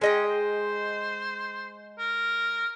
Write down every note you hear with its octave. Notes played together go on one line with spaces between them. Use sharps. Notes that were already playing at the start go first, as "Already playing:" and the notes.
G#3 C#4 D#5 G5
C5
A#4